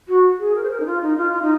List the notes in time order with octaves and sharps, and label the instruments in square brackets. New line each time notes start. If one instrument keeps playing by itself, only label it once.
[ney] F#4
G#4
A#4
C5
A#4
D#4
F4
D#4
F4
F4
D#4